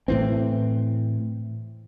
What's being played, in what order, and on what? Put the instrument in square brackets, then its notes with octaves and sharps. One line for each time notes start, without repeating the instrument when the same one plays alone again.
[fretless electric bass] A2 E3 C4